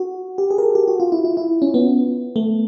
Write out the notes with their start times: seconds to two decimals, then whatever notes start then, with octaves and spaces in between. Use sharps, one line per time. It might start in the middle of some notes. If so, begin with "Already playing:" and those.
Already playing: F#4
0.38 G4
0.50 G#4
0.58 A#4
0.63 A4
0.75 G4
0.88 F#4
1.00 F4
1.12 E4
1.24 E4
1.37 E4
1.62 C#4
1.74 B3
2.36 A3